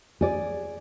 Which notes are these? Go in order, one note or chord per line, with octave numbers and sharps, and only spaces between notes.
G#4 D5